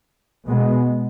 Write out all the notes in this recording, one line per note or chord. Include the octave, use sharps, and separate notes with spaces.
B2 G#3 B3